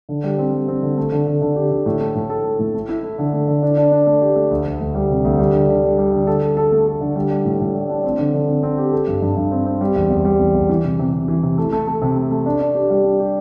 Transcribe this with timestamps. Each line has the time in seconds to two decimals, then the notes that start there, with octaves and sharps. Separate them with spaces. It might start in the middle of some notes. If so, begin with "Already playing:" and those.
0.09 D3
0.24 G3
0.38 C4
0.53 G3
0.68 C4
0.83 D3
0.97 A3
1.12 D3
1.27 D3
1.42 D3
1.56 G4
1.71 D3
1.86 A2
2.00 A3
2.15 A2
2.30 A4
2.44 A3
2.59 A2
2.74 A3
2.89 E4
3.03 A3
3.18 D3
3.33 A3
3.48 D3
3.62 D4
3.77 D4
3.92 D4
4.07 A3
4.21 G4
4.36 A3
4.51 D2
4.65 D2
4.80 D2
4.95 G3
5.10 C3
5.24 D2
5.39 G3
5.53 D3
5.69 D3
5.83 G3
5.98 G3
6.12 D3
6.27 A4
6.42 A4
6.57 A4
6.71 A3
6.87 A4
7.01 D3
7.16 G3
7.30 G3
7.45 A2
7.60 A2
7.75 G3
7.90 D4
8.04 C4
8.19 D3
8.34 D3
8.48 C4
8.63 C4
8.78 G4
8.92 A4
9.07 G2
9.22 G2
9.37 G2
9.51 C4
9.66 C4
9.81 G3
9.96 E2
10.10 E2
10.25 G3
10.39 E2
10.54 E2
10.69 E3
10.84 C3
10.99 C3
11.13 C3
11.28 E3
11.43 C3
11.58 A3
11.72 A3
11.87 A3
12.02 C3
12.16 A3
12.31 A3
12.46 D4
12.61 D4
12.75 G4
12.90 G3
13.04 D4
13.20 G4